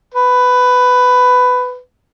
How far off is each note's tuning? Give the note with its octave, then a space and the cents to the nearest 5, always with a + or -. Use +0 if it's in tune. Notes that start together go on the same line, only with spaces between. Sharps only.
B4 +15